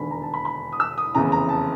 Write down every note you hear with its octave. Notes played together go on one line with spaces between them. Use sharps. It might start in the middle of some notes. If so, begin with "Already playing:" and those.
Already playing: E1 D#2 D3 B5
A#5
A5
B5
B5
D#6
E6
D#6
F1 E2 C#3 E3 A#5
A#5
A5